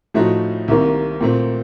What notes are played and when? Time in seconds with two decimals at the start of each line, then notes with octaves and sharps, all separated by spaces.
0.14 A2 F3 A3 D#4 F#4
0.68 C2 C3 D#3 A#3
1.21 A#2 A3 C4